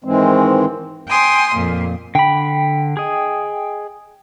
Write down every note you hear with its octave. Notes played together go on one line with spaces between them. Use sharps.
G#2 D#3 E3 G#3 C4
G5 G#5 C6 D#6
F2 A#2
D3 G5 B5
G#4 D#5